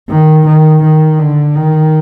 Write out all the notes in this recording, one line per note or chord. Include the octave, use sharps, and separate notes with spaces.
D#3
D#3
D#3
D3
D#3